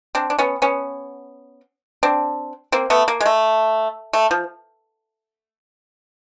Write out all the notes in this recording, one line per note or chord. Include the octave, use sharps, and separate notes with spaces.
C4 D4
D4
B3 C#4
B3 C#4
C4 D4
A#3 C4
A3 B3
A#3
G#3
A3
A3
F3